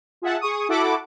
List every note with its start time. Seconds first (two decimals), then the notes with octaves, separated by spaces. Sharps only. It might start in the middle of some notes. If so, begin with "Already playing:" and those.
0.22 F4 G#4 E5 F#5 A5
0.41 G#4 C#6 D#6
0.69 E4 F#4 A4 F#5 B5 D6